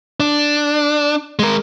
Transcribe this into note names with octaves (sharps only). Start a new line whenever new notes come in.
D4
G#3 A#4